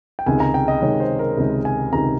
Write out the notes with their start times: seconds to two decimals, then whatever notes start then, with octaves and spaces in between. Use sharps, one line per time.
0.19 G5
0.26 C#2 C3 D#3 G#3 G#5
0.40 A#5
0.54 G5
0.68 D#5
0.82 C#2 C3 D#3 G#3 C#5
1.00 C5
1.19 A#4
1.37 C#2 C3 D#3 G#3
1.65 G#5
1.93 C#2 C3 D#3 G#3 A#5